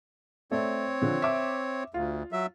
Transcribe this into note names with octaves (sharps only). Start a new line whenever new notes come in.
A3 C4 A4 C#5 D5
D3 F3
E5 D6
D2 F4
F#3 E5